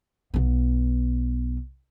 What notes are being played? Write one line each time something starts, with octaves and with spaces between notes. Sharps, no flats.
B1 B3